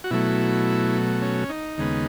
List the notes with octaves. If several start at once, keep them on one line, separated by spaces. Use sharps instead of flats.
F#4
B2 F#3 A3 E4
C#4
D#4
D#2 C#3 G#3 B3